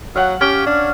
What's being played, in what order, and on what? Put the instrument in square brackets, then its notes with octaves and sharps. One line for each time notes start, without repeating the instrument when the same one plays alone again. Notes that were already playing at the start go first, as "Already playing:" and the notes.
[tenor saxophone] F#3 [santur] F5 F#5
[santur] C#4 [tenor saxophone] G4
[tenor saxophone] D4